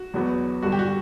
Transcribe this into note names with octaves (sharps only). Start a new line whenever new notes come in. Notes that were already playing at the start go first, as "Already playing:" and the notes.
Already playing: F#4
E2 B2 F#3 B3
G2 D3 G3 F#4
G4
F#4